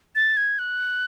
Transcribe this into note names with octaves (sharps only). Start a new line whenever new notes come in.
A6
G#6
F#6